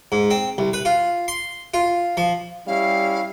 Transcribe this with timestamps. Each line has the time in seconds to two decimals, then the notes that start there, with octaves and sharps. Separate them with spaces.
0.12 G#2
0.31 C4
0.58 C2
0.73 B4
0.85 F4
1.28 C6
1.74 F4
2.17 F3
2.67 G3 C#4 E4 F5